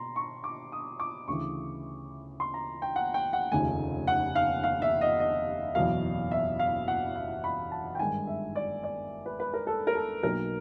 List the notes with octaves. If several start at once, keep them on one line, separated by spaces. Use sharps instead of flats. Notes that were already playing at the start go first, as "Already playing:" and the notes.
Already playing: B2 A#5 C6
C#6
D6
D#6
D6
D2 C#3 E3 C#6
C6
A#5
G5
F#5
G5
F#5
F1 D#2 C#3 F3 A3 G#5
F#5
F5
F5
E5
D#5
D#5
F#1 E2 B2 F#3 F5
E5
F5
F#5
F5
B5
A5
G5
G#1 G2 D#3 G#3 G#5
E5
D5
D5
B4
B4
A#4
A4
A#4
A4
B1 B2 F#3 A#3 A#4